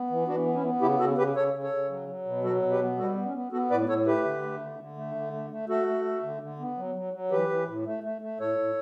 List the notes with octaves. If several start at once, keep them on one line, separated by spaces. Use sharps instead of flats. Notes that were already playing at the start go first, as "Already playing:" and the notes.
Already playing: B3
E3
E3 D4 F#4
B3
C#4 E4
B3
C#3 E4 G4
C#3 F#4 A4
C#3 G4 B4
C#3 A4 C#5
C#3
A4 C#5
C#3
F#3
F#3
B2
F#3 F#4 A4
B2
G4 B4
B3
G3 F#4 A4
B3
C#4
B3
B3 F#4 A4
A2 B4 D5
A2 A4 C#5
A3 G4 B4
D3
A3
D3
D3
A3
D3
A3
A3
A3 F#4 A4
A3
A3
D3
D3
B3
F#3
F#3
F#3
E3 G4 B4
E3
A2
A3
A3
A3
A2 A4 C#5
A2